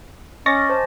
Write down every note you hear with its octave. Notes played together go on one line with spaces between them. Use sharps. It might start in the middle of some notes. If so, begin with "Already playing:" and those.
C#4 D#5 C#6 D6 A6 A#6
C5 G#5 A5